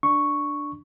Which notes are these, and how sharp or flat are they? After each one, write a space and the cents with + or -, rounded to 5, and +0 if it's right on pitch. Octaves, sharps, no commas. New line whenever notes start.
D4 +5 C#6 +0